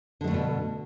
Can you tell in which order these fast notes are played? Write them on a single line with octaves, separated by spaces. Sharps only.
D3 G#3 A3 G2 B2